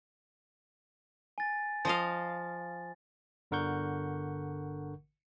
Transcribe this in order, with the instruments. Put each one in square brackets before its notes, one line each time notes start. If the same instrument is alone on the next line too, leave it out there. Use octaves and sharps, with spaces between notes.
[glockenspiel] G#5 A6
[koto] F3 D#5 F5
[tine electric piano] G1 D3 A#4 F#5 C#6 G6